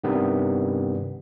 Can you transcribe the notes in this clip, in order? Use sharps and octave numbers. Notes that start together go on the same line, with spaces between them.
G2 C3 D#3 G3 B3